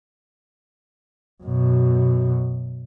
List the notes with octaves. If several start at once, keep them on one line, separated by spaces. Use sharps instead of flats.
F#2 B2